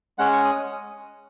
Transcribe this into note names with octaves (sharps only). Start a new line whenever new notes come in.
G#3 C#4 G#4 F#5
C#6
D#6